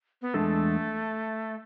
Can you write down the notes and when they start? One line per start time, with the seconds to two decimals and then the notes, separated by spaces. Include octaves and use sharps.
0.22 B3
0.34 E2 C#3 G#3 A3 D4 A4